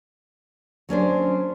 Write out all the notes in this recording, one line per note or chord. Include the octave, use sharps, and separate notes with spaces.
F#3 C#4 D4 C5